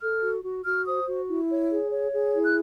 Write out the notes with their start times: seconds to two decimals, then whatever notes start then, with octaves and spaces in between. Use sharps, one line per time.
0.01 A4 F6
0.23 F#4
0.44 F#4
0.65 F#4 F6
0.86 C5 D#6
1.07 F#4
1.28 E4
1.49 C#5
1.71 G#4
1.92 C#5
2.13 G#4
2.34 E4
2.44 F#6